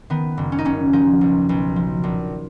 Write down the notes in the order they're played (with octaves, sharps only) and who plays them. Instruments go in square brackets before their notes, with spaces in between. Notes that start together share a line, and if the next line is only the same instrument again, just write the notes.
[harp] D#3 B3
F#1
C#4
D#4
F#1 C#4
F3 D#4
B1
B1
F3
A#1